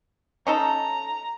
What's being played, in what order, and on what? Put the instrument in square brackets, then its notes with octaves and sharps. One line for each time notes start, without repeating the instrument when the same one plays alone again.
[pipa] C#4 D#4 A4 [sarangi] A#5